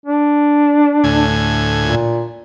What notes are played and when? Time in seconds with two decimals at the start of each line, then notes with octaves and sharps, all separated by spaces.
0.06 D4
1.04 D2 A2 G#5
1.82 A#2